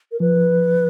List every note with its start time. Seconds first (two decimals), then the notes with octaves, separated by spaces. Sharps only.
0.12 A#4
0.20 F3 B4